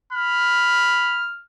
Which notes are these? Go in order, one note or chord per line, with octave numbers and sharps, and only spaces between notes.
B5 F6